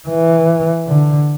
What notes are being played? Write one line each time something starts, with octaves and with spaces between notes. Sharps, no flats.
E3
D3